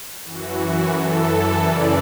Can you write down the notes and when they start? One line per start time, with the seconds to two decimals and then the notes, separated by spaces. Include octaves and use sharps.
0.25 F#2 E3 F#4
0.58 F#4
0.91 F#2 E3 A4
1.58 F#2 C#3 E3 D5